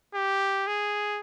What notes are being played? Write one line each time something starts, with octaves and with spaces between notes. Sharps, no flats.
G4
G#4